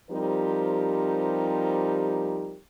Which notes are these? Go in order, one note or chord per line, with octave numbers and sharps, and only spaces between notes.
F3 G3 C4 D#4 G4 A#4